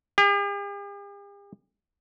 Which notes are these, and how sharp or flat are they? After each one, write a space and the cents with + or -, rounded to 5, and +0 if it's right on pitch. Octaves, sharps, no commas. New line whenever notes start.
G4 +45